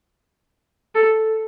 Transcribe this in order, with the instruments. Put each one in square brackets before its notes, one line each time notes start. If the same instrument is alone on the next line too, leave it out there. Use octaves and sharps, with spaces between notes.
[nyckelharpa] A4